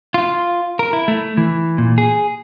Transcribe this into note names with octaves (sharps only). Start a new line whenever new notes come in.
F4
A#4
E4
A3
E3
A#2
G#4